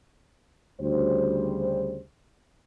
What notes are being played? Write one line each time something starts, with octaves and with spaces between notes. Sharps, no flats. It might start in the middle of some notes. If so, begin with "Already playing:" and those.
D2 C#3 G3 C5